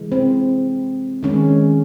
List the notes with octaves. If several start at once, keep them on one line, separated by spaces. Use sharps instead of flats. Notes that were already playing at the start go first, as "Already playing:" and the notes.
Already playing: C3 E3 G#3
C4
D#3 G#3 C#4